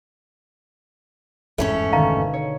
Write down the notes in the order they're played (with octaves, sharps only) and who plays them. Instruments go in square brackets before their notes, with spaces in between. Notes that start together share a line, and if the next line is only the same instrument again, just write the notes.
[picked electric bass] G1 E2 G#2 [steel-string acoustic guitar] A3 C#4 C#5
[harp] B2 D3 D#3 [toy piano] F5 A#5
[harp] C#5